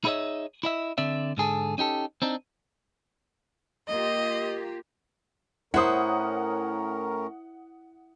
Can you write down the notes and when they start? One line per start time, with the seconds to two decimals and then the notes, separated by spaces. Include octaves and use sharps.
0.04 D#4 E4 G#4 C#5 D#5 E5
0.63 E4 D#5 E5
0.98 D3 C4 D5 E5
1.37 G#2 D3 G#4 A4
1.78 C#4 D#4 G4 A4
2.22 C4 D4 D#4
3.88 A#3 F4 G4 D#5
5.74 A2 C#4 E4 A#4 C5 F#5 D#6